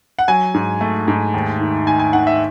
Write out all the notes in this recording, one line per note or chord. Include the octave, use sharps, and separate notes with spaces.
F#5
F#3 G#5
G#2
A3
G#2
D#2
D#3
D#3 G#5
G#5
D#3 F#5
E5